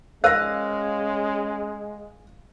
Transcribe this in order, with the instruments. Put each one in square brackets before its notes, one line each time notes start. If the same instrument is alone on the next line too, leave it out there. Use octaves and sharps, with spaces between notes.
[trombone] G#3 [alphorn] C#4 [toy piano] A#4 C5 [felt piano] F5 A#6